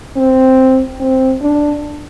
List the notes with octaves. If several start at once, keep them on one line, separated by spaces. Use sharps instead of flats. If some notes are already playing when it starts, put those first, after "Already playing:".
C4
C4
D4